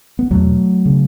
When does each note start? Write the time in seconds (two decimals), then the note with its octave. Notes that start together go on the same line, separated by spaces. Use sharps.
0.19 B3
0.31 E2 B2 F#3 A3
0.86 C#3